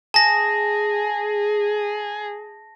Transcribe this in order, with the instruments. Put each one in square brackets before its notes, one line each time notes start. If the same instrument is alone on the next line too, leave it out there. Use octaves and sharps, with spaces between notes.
[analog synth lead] G#4 [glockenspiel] A5 A#6